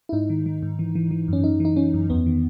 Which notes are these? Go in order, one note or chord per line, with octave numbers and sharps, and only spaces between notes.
E4
G#2 D#4
D#3
D#3
G#2
E3
E3
E3
F#2 C#4
F#2 D#4
E3 D#4
E3 C#4
F#2
E2 B3
D#3